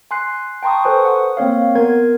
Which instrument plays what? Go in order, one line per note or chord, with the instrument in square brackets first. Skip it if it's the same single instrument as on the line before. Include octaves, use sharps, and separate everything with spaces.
[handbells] G#5 C6 F#6 C7
G5 A5 A#5 C6 C#6 D#6
A4 B4 C5 G#5 C#6 D#6
F#5 D#6
A#3 C4 C#5 F5
B3 A#4 G#6